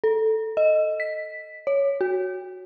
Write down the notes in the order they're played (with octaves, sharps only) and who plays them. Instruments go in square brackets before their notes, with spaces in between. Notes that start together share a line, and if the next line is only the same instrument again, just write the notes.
[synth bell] A4
D#5
B6
C#5
F#4